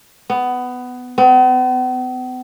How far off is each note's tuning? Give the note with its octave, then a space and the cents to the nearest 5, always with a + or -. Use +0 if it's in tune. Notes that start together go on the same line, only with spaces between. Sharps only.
B3 +15
B3 +45